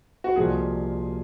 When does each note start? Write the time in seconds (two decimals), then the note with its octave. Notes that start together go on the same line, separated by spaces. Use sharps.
0.24 F#4
0.36 C2 A#2 F3 G#3 G#4